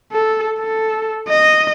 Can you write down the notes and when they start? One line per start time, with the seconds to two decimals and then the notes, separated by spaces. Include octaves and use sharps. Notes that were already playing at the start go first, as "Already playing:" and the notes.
0.12 A4
0.59 A4
1.29 D#5